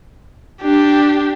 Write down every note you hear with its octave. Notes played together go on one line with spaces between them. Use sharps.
D4 G4